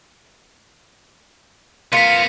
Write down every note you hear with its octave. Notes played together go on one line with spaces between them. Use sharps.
B3 F4 A#4 B6 C#7 D#7